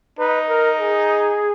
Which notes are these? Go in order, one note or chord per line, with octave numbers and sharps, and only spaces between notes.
D#4 B4
A#4
G#4